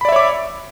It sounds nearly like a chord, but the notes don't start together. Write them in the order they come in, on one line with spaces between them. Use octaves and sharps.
B5 D5 E5 C#5 D6